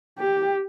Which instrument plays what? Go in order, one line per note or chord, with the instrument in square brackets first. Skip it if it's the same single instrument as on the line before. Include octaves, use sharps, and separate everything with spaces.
[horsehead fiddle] G4